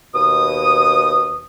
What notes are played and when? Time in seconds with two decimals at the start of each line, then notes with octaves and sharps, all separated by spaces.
0.15 D#2 B2 D#6